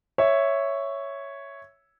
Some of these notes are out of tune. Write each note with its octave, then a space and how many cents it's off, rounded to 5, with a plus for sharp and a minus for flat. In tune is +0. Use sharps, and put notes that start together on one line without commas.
C#5 +0 E5 +0